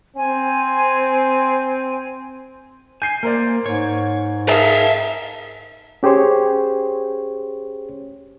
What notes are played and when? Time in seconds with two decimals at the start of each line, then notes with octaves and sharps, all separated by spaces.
0.16 C4 G#5
3.02 G#5 G6 C7
3.23 A#3 A#4 C5 D5
3.66 G#2 C#5
4.49 G#4 A#4 D#5 E5 A5 A#5 C7
6.03 C#4 G4 G#4 C5 C#5